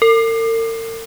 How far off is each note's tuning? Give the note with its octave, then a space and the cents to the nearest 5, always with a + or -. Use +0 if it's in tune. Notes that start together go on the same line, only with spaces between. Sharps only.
A#4 -45